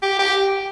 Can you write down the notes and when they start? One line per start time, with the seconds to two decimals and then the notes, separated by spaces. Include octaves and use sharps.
0.02 G4
0.19 G4